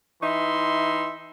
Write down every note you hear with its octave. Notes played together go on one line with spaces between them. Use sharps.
E3 D#4 E5 C6